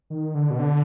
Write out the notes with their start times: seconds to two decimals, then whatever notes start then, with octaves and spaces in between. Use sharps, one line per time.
0.10 D#3
0.35 D3
0.50 B2
0.59 D3